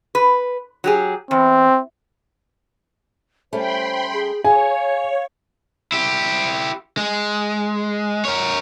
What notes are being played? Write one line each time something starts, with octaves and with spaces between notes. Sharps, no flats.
B4
F#3 G4 G#4
E2 C4
G3 A3 C#4 C5 G5 B5 C6
G#4
G#4 C#5 F5 G#5
E4 G4
G#3
A#4 C#5